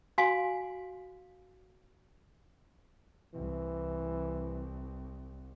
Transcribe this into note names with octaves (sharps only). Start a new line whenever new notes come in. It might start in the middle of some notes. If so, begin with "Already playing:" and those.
F#4 F5 G#5 C6
C2 E3